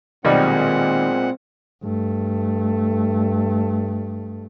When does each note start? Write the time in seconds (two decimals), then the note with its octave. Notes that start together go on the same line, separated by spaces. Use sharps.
0.25 B1 A#2 D#3 G3 G#3 C4 D#5 F#5
1.83 G2 A3